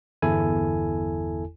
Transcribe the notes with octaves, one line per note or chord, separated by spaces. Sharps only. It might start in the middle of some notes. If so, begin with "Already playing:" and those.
G1 E2 E4 A4 G#5